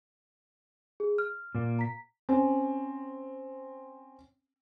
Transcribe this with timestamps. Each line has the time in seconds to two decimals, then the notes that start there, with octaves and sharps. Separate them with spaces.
1.00 G#4
1.18 F6
1.55 A#2 A#3
1.79 A#5 B6
2.29 C4 C#4